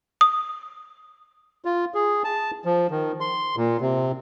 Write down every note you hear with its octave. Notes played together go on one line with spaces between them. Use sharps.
D#6
F4
G#4
A5
F3
D#3
C6
A#2
C3